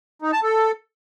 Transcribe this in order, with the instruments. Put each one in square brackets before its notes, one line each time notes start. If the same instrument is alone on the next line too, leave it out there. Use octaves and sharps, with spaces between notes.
[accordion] D#4
A5
A4